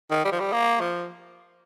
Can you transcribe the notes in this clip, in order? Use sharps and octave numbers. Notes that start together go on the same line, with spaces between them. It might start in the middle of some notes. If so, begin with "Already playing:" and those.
D#3
G3
F3
G3
A#3
F3